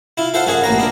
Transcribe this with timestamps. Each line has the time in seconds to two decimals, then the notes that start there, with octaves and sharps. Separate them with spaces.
0.17 E4 F4
0.34 F4 A4 C5 F5 F#5
0.47 F#2 F#4 G#4 C#5
0.64 A1 A#3 F#4 A#5
0.77 B3 D4 A#4